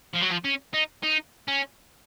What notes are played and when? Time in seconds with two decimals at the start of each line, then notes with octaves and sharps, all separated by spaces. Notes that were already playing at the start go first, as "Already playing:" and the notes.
0.15 F3
0.23 F#3
0.32 F3
0.45 C#4
0.74 D#4
1.03 D#4
1.48 C#4